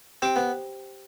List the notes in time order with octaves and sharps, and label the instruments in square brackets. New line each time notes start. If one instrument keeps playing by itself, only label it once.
[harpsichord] C4 [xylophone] G4 C5 G5
[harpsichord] B3